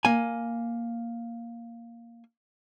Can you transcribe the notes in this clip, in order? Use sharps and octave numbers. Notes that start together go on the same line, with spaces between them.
A#3 G#5